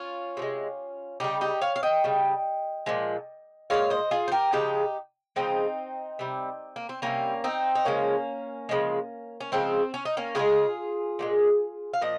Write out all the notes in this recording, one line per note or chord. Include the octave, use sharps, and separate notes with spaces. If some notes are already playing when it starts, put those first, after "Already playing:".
Already playing: C#4 F4
C3 F3 G#3
C#3 G3 D#4 G4
D#4 G4
C#5 F5
F5
D#5 G5
C#3 G3
A#2 F3 G#3
A#2 F3 G#3 C#5 F5
C5 D#5
F4 G#4
C5
G4 A#4
C#3 F3 G#3 D#4 G4
C#3 F3 G#3 C4 D#4
C3 G3
A#3
C4
C3 G3 A#3 C#4
C4 D#4
D#4
C#3 F3 G#3 A#3 C#4
C#3 F3 G#3
C#4
C#3 F3 G#3 C4
C#4
D#4
A#3 C#4
C#3 F3 G#3 F4 G#4
A#2 F3 G#3
F5
A#2 F3 D#5